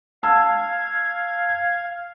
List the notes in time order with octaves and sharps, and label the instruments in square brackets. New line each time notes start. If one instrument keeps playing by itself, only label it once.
[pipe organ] F5 G#6 [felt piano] A5 E6